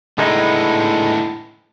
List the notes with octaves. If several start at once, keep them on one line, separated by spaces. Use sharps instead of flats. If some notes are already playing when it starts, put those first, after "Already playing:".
A2 D3 G#3 B3 D#4